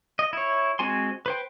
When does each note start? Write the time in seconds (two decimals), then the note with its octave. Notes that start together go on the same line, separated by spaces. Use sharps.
0.19 D#5
0.33 E4 C#5
0.79 G#3 C4 F#4 G#5 C6
1.26 B4 C5 G5